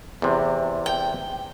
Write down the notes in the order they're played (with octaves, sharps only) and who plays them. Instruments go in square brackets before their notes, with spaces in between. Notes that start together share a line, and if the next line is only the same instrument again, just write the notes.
[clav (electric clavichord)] E2 C3
[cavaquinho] G5